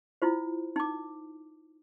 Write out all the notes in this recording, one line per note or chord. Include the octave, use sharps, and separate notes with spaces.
E4 F4 C5
D#4 D6